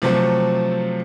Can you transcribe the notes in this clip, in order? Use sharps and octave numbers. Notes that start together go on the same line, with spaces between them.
C3 F3 F#3 A3 C4